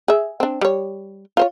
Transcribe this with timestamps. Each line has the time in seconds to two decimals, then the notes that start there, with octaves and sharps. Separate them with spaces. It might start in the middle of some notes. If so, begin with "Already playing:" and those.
0.08 G#4 E5
0.40 C4 D4
0.61 G3 C#5
1.37 F4 C5 C#5